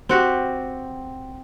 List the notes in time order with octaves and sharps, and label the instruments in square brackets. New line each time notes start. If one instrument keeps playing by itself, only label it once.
[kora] C4 F#4 G4